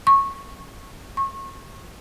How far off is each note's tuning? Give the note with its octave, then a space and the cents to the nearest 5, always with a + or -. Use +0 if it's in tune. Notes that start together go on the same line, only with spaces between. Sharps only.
C#6 -15
C#6 -30